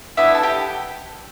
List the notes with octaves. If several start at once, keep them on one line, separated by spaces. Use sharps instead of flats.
B3 D4 E4 A4 E5
A5
G4 G5